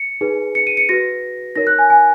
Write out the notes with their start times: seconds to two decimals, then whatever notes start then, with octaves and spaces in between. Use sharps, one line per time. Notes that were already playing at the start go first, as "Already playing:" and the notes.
Already playing: C#7
0.21 D#4 G#4 B4
0.55 C#7
0.67 D#7
0.77 C#7
0.89 F#4 B4 A#6
1.55 D#4 A#4 C#5 A#6
1.67 F#6
1.79 G#5
1.90 G#5